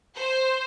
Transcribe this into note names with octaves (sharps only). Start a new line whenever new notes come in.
C5